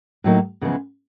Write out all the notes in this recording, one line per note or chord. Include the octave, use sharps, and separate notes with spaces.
A2 F#3 A#3 D#4
E2 C#3 F3 G#3 B3